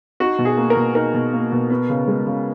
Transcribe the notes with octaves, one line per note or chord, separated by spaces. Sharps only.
D#4 F#4
B2
G#4
A#3
A#4
B2
D#4 A#4
B2
A#3
B2
B3
C#3
G#3
C#3